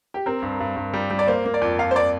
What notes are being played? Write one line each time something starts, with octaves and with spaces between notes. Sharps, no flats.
G4
C4 A#4
G2
G2
G2
G3
G3
D5
A#3 C5
A#3
D5
F2
F3 F5
C5
D5